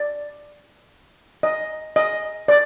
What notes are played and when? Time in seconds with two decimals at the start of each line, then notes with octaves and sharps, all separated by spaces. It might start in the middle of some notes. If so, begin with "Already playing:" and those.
Already playing: D5
1.43 D#5
1.96 D#5
2.48 D5